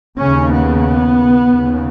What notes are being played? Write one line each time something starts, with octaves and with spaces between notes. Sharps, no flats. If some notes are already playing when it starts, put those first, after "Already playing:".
D#2 C#3 C#4
B3
D#2 C#3